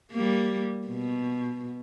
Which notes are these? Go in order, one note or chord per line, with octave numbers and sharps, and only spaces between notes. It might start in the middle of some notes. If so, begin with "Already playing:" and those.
G3 A#3
B2